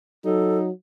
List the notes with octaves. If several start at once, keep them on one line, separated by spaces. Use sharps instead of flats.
F#3 D#4 A4